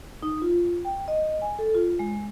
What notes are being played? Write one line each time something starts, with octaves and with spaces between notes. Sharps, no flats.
D#4
F4
G5
D#5
G#5
A4
F4
G#3